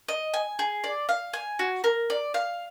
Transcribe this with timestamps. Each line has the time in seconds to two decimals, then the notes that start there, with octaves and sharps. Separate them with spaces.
0.08 D#5
0.34 G#5
0.59 G#4
0.84 D5
1.09 F5
1.33 G#5
1.59 F#4
1.84 A#4
2.10 D5
2.34 F5